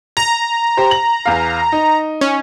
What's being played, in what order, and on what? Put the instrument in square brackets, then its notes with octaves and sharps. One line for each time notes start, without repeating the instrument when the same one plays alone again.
[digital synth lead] A#5 [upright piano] F7
[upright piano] G4 C5
F#7
E2 F5
D#4
[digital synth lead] C#4